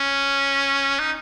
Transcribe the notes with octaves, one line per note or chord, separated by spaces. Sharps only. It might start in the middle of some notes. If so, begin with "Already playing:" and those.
Already playing: C#4
D#4